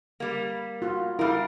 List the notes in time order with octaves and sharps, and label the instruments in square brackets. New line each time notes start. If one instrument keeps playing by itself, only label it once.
[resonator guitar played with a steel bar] G3 A#3
[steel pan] F4 F#4
[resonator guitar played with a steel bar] G3 A#4 [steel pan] E4 F5